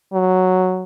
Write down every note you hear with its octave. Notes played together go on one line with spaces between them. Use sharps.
F#3